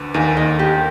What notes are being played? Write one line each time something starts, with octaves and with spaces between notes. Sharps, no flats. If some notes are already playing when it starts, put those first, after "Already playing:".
Already playing: D2 D3 B4
D#2 D#3 G#5
D#5
G4